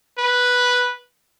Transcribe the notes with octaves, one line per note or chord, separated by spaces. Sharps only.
B4